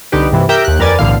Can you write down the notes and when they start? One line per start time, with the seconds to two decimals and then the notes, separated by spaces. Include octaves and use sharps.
0.12 C2 D3 D#4 G4 B4
0.32 G2 C3 E3
0.49 G4 A#4 E5 G5 A#5 G6
0.65 D#2 G4 F#6
0.79 F2 A#4 B4 D5 G#5 A6
0.99 B1 A2 D3 E3 F5